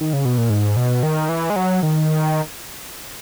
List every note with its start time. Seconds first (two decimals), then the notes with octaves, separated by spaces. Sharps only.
0.01 D#3
0.13 C#3
0.25 B2
0.38 A#2
0.50 G#2
0.77 B2
1.03 D#3
1.29 E3
1.50 G#3
1.56 F#3
1.83 D#3